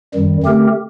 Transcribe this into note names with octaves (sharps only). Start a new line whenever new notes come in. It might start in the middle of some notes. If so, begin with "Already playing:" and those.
F#2 D#3 G3
D3 A3 C4 G4 A#4